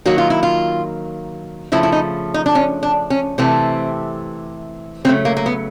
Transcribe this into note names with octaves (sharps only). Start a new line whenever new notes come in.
D#3 F#3 A#3 F#4
F4
E4
F4
C#3 F3 A3 E4
E4
D#4
D#4
D4
C#4
D4
C#4
C3 E3 A3 C4
C#3 F#3 A3 C4
A#3
A#3
B3